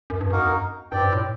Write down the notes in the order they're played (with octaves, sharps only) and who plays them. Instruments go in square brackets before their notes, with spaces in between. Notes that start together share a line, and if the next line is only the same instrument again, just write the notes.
[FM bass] F#2
G2
[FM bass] F#2 [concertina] A#3 D#4 F#4 A#4
[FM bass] F#2
[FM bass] G2 [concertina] C4 G4 D5 G5
[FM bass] G2
A2